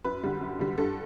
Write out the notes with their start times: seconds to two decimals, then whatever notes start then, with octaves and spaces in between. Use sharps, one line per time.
0.04 F#2 B4
0.23 D3 G3
0.41 F#2
0.59 D3 G3
0.78 G2 A4